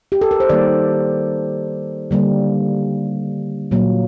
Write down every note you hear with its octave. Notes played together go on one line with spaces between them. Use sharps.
G4
A4
A#4
C5
D#3 G3 A#3 D5
D3 G3 A#3
A#2 F#3 A#3